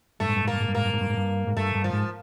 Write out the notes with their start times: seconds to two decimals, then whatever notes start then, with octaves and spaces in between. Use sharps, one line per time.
0.20 G2 A3
0.29 G#2
0.36 G2
0.44 G#2
0.48 A#3
0.53 G2
0.60 G#2
0.68 G2
0.75 G#2 A#3
0.85 G2
0.93 G#2
1.01 G2
1.10 G#2
1.17 G2
1.47 G#2
1.56 G2 A3
1.75 G2
1.84 F3
1.93 G#2